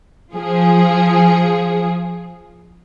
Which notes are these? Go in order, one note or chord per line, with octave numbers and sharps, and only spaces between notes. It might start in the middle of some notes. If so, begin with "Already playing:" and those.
F3 G#4